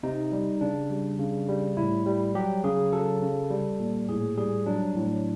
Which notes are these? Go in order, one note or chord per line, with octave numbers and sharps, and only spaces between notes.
C3 D#4
G3
C#3 D4
G3
C#3
G3
A2 E4
G3
F#3 G4
C#3 G#4
F#3 A4
C#3
G3
A#2
A2 G#4
G3 G#4
F#3 D4
A2